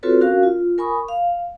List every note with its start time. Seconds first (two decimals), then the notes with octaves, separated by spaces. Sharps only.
0.03 C4 F4 F#4 A4 B4 C#5
0.21 C#4 F#4 A#4 F5
0.43 F4
0.78 A#4 G#5 B5 C#6 D#6
1.08 F5